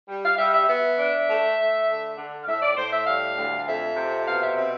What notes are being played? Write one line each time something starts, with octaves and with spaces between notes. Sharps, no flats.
G3
F5
G3 E5
E5
B3 E5
D4
A3
A3
D3
D3
F5
A2 E5
D5
A2 C5
E5
G3 F5
D2
F2 E5
C3
B2 F5
E5
C4 E5